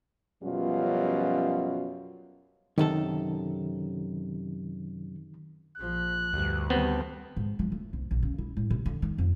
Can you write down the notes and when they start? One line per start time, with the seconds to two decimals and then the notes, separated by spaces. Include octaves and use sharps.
0.43 F#2 B2 F3 G3 C#4 F4
2.78 F#2 C3 D#3 A4
5.78 A#1 F3 F#6
6.33 D2 G2
6.70 D#3 G3 B3 C4
7.37 G#2
7.59 F3
7.72 A3
7.93 C2
8.11 A#1
8.23 C#3
8.38 E4
8.57 A2
8.70 C3
8.86 D3
9.02 D#3
9.18 F2